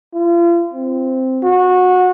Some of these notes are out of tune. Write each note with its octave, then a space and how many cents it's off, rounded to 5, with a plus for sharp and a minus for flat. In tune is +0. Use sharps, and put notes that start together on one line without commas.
F4 -35
C4 -5
F#4 -20